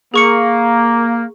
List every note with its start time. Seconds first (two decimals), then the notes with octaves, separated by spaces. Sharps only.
0.14 A#3 G#4 C#6 C#7